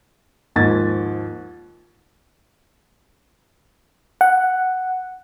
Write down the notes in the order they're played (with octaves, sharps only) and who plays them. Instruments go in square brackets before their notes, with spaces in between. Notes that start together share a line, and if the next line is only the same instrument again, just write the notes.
[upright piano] D#2 G#2 F3 G#6 A6
[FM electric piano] F#5